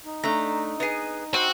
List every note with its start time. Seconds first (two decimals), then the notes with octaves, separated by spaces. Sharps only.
0.05 D#4
0.24 A3 D4 A#5
0.80 B3 G#4 D#5
1.34 C4 F#4